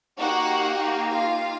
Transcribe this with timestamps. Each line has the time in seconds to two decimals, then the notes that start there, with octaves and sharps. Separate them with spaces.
0.18 A#3 D#4 F#4 G4 F#5
1.10 F4 F5